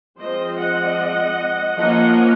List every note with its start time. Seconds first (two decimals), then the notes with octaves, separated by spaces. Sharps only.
0.18 F3 G#3 C4 C5 D#5
0.58 D#5 F#5
1.78 F3 A#3 C#4 D#5 F#5